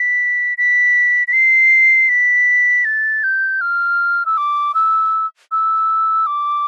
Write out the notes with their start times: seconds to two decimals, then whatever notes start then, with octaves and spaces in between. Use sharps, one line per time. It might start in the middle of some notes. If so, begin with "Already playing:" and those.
Already playing: B6
0.58 B6
1.28 B6
1.33 C7
2.09 B6
2.85 A6
3.23 G6
3.61 F6
4.26 E6
4.37 D6
4.75 E6
5.52 E6
6.27 D6